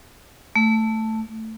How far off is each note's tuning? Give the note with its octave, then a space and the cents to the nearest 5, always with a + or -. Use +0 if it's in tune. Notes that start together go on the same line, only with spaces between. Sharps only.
A3 +5